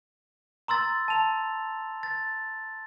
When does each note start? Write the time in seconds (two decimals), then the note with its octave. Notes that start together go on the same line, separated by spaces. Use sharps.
0.68 A#5 C6 E6 A6
1.08 A5 F7
2.03 A6